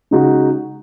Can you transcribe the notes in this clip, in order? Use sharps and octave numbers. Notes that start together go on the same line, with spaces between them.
C#3 G#3 D#4 F#4